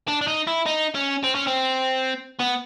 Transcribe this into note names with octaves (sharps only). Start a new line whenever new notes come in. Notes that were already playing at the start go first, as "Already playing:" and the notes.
D4
D4
D#4
E4
D#4
C#4
C4
C#4
C4
B3